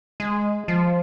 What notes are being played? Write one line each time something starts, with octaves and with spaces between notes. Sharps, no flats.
G#3
F3